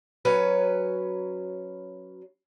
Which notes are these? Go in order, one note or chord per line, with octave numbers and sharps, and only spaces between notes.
F#3 C#4 B4